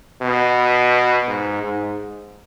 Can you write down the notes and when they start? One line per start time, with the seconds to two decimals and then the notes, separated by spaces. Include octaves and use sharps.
0.22 B2
1.28 G#2
1.63 G#2